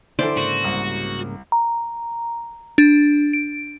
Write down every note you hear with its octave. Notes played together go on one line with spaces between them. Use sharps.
D3 E3 E4 C5 D5
G#2 C#3 A#3 F#4
C2
A#5
D4
D7